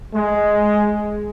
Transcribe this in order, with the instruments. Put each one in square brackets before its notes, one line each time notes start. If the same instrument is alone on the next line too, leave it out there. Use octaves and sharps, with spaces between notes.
[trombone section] G#3